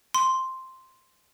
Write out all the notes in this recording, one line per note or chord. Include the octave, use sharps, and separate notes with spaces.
C6